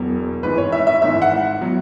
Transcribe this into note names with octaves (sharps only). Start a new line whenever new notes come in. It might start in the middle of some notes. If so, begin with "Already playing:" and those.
Already playing: E1 E2 B2 F#3
G#1 G#2 E3 B4
C#5
E5
E5
G#1 G#2 E3 E5
F#5
B2 F#3